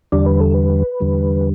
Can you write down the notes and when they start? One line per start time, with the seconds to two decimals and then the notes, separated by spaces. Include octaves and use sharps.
0.12 E2 D3 G3 D5
0.26 B4
0.40 A4
0.54 B4
1.00 E2 D3 G3